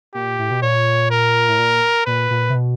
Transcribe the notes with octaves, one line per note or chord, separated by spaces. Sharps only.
A#2 G4
A2
B2
A#2 C#5
A#4
A2
A#2
A#2 B4
A#2
C3
B2